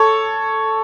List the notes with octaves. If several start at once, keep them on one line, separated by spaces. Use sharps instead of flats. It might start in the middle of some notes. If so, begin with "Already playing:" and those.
Already playing: A4 C#5